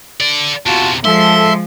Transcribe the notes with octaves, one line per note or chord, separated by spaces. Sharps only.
A4 D5
E2 C3 F4 F#4 A5
F3 G#3 A4 E5 C6